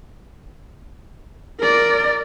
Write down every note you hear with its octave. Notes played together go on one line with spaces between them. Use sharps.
A#4 D5